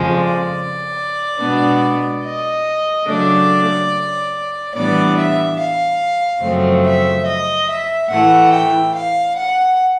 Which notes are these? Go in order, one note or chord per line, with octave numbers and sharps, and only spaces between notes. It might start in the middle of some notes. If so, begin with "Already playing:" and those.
Already playing: F2 C#3 F3 G#3
D5
B2 G#3 B3 D4
D#5
C#3 F#3 A3 D4 D5
A2 E3 G3 B3 D4 D5
E5
F5
F#2 C#3 F3 A3 C4
E5
D#5
E5
A2 E3 A3 F#5
G5
F5
F#5